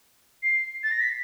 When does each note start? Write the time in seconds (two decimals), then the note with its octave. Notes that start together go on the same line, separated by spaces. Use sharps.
0.43 C7
0.83 A6
0.91 A#6
1.01 B6